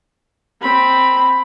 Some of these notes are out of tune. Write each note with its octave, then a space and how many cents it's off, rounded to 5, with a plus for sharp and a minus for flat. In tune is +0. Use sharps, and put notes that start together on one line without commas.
C4 +0 B5 +0